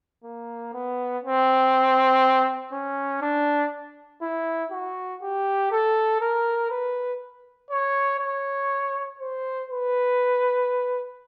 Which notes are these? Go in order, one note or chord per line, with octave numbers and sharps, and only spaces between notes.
A#3
B3
C4
C#4
D4
E4
F#4
G4
A4
A#4
B4
C#5
C#5
C5
B4